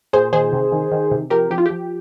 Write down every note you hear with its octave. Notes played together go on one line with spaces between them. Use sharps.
A#2 G#4 C5
D#3 G#4 C5
C3
D#3
D#3
C3
F3 G4 A#4
F3 G4
F4
F3 G4